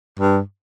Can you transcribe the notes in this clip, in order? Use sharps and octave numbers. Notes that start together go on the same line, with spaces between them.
G2